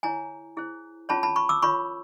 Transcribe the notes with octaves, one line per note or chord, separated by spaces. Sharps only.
E4 G#4 C#5 G#5 A#5
E4 G#4 C5
C#4 F4 G#4 C#5 A5 B5
A5 B5
B5 C#6
D6 E6
F4 A#4 C#5 B5 C#6